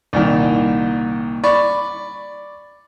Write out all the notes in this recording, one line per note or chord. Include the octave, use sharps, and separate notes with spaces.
C2 A#2 D#3
D5 B5 C#6